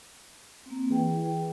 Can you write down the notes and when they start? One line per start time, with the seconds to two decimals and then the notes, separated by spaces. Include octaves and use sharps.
0.66 A#3 C4
0.90 E3 G#4 G5